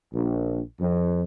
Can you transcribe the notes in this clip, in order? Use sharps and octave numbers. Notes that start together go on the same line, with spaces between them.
A#1
F2